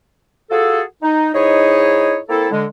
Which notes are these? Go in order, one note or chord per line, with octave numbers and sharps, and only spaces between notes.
F4 F#4 G#4 A4
D#4
G#2 D#4 E4 G#4 C#5
A#3 C4 E4 A4
D3 G#3